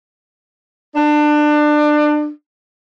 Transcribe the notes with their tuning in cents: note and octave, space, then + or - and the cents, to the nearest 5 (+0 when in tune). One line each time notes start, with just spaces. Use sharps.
D4 +25